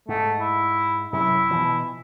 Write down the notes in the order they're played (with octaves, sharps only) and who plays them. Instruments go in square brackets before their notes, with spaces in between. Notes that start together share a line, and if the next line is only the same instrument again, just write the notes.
[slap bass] G#2 [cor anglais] A3
[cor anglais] E4
[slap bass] F#2 C3 [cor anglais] E4
[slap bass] B2 E3 F3